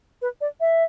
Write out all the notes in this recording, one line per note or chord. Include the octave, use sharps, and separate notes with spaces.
B4
D5
E5